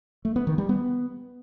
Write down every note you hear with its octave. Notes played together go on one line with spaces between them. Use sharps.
A3
B3
D#3
G3
B3